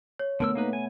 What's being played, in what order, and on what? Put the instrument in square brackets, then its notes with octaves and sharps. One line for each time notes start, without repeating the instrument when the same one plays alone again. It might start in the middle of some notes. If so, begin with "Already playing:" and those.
[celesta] C#5
[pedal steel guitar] D3 A#4 E6 [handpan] A3 B3
[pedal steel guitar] A#3 D#4 B4
G#5